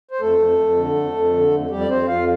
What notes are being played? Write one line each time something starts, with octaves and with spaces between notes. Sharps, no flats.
C5
F2 A3 A4
F2
F2
D3
F2
F2
D3
F2
F2 G3 G4
D5
F2 C4 C5
F2 F4 F5